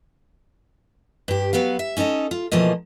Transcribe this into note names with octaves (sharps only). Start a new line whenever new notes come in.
G2 G4
F#3 B3 B4 F5
E5
C#4 D#4 A4 B4 D#5
F4
B2 E3 F3 A3 A#3 D#5